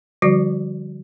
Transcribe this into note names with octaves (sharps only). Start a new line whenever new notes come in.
D3 F3 G3 F#4